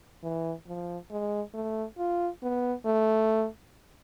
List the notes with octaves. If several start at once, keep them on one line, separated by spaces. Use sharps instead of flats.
E3
F3
G#3
A3
F4
B3
A3